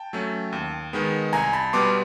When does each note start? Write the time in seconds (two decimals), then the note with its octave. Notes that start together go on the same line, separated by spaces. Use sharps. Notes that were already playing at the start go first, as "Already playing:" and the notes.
Already playing: G5 A5
0.13 F#3 A3 C#4
0.53 D#2
0.93 D#3 G#3 B3
1.33 C2 G#5 A#5
1.53 A5 B5
1.73 B2 G3 B3 C6 D6